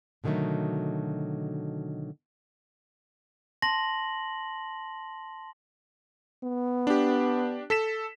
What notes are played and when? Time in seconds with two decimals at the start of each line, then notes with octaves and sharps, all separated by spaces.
0.24 B2 D3 D#3 F#3 A3
3.62 A5 C6 A#6 F#7
6.44 B3
6.87 D4 G4
7.70 A4 B6 E7